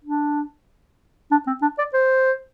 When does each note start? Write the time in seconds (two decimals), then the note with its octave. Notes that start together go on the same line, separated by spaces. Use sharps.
0.05 D4
1.31 D4
1.47 C4
1.62 D4
1.78 D5
1.94 C5